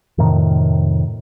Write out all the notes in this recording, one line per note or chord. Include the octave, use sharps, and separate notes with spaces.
F2 A2 C3 D#3